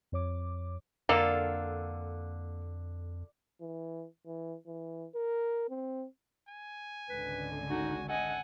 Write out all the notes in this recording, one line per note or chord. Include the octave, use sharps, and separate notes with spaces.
F2 C#5 D6
F2 D3 A#3 F4 A4
E3
E3
E3
A#4
C4
G#5
G#1 C#2 D3 B4
D#4 F#4
A4 D#5 F#5 G#5